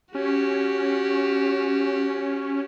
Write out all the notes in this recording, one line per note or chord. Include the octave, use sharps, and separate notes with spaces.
C#4 F#4 G4